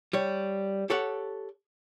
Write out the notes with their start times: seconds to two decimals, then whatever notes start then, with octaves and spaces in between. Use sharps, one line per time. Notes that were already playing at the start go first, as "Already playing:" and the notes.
0.13 G3 C#5
0.90 G4 A4 C#5 F#5